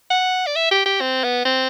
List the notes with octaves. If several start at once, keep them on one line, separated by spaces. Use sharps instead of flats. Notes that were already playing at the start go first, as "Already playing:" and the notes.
F#5
D5
E5
G4
G4
C4
B3
C4